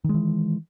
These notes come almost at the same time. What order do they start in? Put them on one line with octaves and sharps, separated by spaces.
D#3 G#3 E3